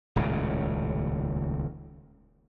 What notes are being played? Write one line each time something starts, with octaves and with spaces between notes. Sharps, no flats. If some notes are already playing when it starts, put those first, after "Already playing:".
D#1 C#2 A2 C#3